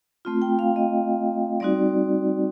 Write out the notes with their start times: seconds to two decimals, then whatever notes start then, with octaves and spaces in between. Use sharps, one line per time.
0.25 A3 C4 F4
0.42 G5
0.59 F5
0.76 D#5
1.60 G3 C4 D#4 F#4 D5